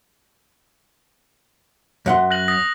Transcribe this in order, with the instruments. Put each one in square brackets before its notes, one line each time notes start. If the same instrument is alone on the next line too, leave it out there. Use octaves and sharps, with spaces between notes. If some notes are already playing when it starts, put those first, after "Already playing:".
[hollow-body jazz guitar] F#2 F#5 C6
[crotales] F#6 A#6 F#7
D#6 A#6